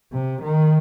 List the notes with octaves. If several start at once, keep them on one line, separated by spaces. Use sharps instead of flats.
C3
D#3